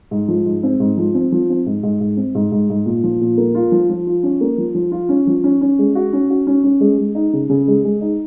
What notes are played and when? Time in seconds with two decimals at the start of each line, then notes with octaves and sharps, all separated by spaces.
0.11 G#2
0.28 F3
0.46 G#2
0.63 C4
0.80 G#2
0.98 F3
1.14 C4
1.32 F3
1.50 C4
1.66 G#2
1.83 G#2
2.00 G#2
2.17 C4
2.35 G#2
2.52 G#2
2.70 G#2
2.86 A#2
3.04 F3
3.21 A#2
3.38 A#3
3.55 F4
3.72 F3
3.90 F3
4.07 F4
4.23 C#4
4.41 A#3
4.58 F3
4.75 F3
4.92 F4
5.09 C#4
5.27 F3
5.44 C#4
5.61 C#4
5.79 G#3
5.95 F#4
6.13 C#4
6.30 F#4
6.47 C#4
6.64 C#4
6.81 G#3
6.98 G#3
7.15 D#4
7.33 C#3
7.49 C#3
7.68 G#3
7.84 G#3
8.01 D#4